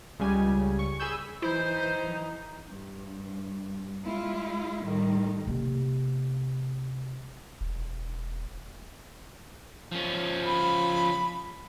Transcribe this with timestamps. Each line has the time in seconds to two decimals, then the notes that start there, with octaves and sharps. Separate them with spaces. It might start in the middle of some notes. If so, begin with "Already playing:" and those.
0.19 C#2 C#3 G3 G#5
0.79 C#6
1.00 G#4 G#5 B5 E6 G6
1.42 E3 D#4 E4 C5
2.68 G2
4.03 G#3 E4 F4
4.83 A2 D#3 G3
5.47 C3 A#3
7.61 E1
9.92 F3 C#4
10.45 B5